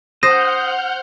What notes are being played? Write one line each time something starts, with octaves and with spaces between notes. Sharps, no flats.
C5 F#5 D#6 F6 G6 A#6